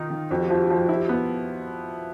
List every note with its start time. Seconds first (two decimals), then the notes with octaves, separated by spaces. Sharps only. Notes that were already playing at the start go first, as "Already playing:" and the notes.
Already playing: D#3 D#4 F4
0.10 D#3
0.31 F2 F#4
0.40 G4
0.48 F3 F#4
0.57 G4
0.67 F3 F#4
0.76 G4
0.86 E4 F#4
0.95 G4
1.04 F#4
1.09 B3 G4